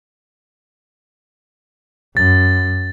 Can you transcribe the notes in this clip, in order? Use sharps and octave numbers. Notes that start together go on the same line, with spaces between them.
F#2 A6